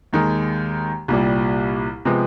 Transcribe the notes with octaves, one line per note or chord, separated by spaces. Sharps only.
D#2 D#3 G#3
C2 A#2 G3
C3 F3 G#3 B3